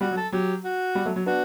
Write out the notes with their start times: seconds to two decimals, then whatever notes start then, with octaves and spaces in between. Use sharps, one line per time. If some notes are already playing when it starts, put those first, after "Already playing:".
0.01 G3 F#4
0.11 F#3
0.17 A4
0.32 F#3 G4
0.64 F#4
0.95 G3
1.06 F#3 A3
1.16 F#3
1.26 B3 D4 F#4